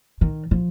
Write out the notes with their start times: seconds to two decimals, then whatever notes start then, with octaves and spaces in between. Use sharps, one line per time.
0.21 D#3
0.51 F3